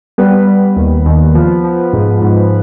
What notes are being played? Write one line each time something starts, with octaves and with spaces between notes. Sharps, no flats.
G3 B3 B4
G3
D#2
D#2
F3
F3
G#2
G#2